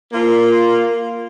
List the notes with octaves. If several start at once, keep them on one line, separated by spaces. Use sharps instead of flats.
A#3 F4